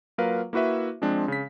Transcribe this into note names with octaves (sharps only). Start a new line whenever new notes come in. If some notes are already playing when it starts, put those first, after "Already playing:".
F#3 A#3 F4 A#4 B4 F5
A#3 E4 F#4 B4 E5
F3 G#3 C4 D4
C#3 B6